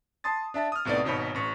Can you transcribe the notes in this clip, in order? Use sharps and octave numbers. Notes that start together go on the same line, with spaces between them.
A5 C6 D#6 A6
D4 E5 A5
D#6 F6
C2 A2 B3 D#4 D5
G#1 B2 D#4 C#5 B5
A1 C#6